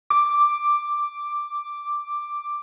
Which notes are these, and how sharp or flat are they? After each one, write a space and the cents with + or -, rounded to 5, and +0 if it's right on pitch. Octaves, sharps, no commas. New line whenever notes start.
D6 +0